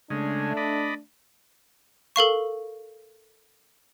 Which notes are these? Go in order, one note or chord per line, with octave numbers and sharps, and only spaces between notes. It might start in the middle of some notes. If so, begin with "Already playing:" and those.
C#3 G#3 A3 D4
D5 D#5 B5
A4 A#4 F5 C#6